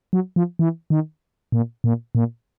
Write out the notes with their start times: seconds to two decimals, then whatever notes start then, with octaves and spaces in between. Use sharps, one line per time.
0.13 F#3
0.36 F3
0.59 E3
0.90 D#3
1.52 A#2
1.84 A#2
2.15 A#2